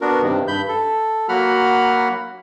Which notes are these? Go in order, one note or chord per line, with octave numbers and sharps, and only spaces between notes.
B3 D4 F#4 A#4
G2 C3 D#3
G2 B5 G6
A4
F#3 A#3 F#4 F#5 B5 F6